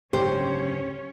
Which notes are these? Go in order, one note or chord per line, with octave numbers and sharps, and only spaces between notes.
F#1 D2 G#2 C#4 G4 C5 C#5